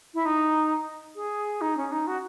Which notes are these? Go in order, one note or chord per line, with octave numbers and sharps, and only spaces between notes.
E4
D#4
G#4
D#4
C#4
D#4
F#4